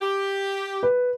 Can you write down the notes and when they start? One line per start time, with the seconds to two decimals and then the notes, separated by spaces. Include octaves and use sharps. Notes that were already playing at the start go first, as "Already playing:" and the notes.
0.02 G4
0.83 B4